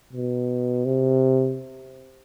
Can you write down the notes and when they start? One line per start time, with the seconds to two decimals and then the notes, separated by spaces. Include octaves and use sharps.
0.13 B2
0.85 C3